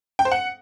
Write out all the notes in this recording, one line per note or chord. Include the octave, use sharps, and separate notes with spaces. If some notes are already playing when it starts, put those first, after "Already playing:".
G5
C5
F#5